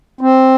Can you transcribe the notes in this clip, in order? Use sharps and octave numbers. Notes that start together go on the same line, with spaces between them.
C4